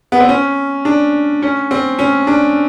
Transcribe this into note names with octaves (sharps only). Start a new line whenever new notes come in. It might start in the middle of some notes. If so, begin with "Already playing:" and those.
B3
C4
C#4
D4
C#4
C4
C#4
D4